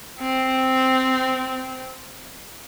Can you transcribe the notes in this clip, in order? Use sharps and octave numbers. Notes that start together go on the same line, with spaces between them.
C4